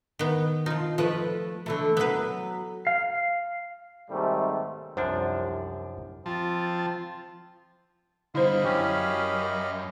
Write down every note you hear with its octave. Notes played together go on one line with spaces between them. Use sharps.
D#3 B3
F3 D#4 F4
F3 A3 B4 D#5
D3 E3 A3
F#3 B3 B4 E5
F5
D#2 G#2 C3 G3 A3 C4
C2 F#2 F3 D4 C5
F3 C4 F4 A5
D3 G3 E4 C5 D#5 F5 B5
F#2 C#4 G4